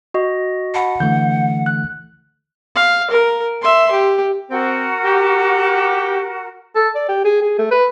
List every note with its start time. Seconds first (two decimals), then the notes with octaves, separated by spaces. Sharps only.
0.14 F#4 D#5
0.74 F#5 A5 B5
1.00 D3 E3 A3 G6
1.66 F#6
2.75 F5
3.11 A#4
3.62 E5 C6
3.92 G4
4.51 C4 F#4 A#4 F#5
5.04 G4
6.76 A4
6.95 D5
7.09 G4
7.25 G#4
7.42 G#4
7.59 A3
7.71 B4